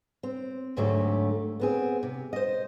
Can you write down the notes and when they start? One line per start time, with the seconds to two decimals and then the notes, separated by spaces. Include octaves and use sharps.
0.23 C4
0.76 D2 G#2 D3 F#3 A3 G4
1.60 B3 C4 G#4
2.03 C3
2.33 C5 D#5